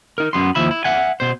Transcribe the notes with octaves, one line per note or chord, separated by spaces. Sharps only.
D#4 A#4
F#2 B3 C6
D#2 F3 E5 B5
E4
E5 F#5 G#5
B2 C5